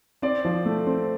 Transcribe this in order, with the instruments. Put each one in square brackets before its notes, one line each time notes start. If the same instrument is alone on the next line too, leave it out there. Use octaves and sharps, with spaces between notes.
[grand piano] C4 C5 D5
F3
A3
C4